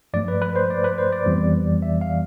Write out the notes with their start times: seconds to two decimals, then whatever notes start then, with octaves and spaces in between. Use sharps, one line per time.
0.14 G2 F3 A3 D5
0.28 B4
0.42 B4
0.56 C5
0.70 D5
0.84 B4
0.98 C5
1.12 D5
1.26 F2 E3 G3 B3
1.82 E5
2.01 F5